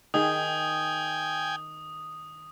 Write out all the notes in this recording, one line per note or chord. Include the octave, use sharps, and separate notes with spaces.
D#3 G#4 G5 G#5 D#6